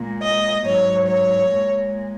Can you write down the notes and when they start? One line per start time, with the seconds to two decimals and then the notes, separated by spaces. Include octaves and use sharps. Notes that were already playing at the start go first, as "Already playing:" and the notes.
Already playing: A#2 G#3
0.22 D#5
0.65 G#2 F#3 C#5
1.07 C#5
1.51 A#2 G#3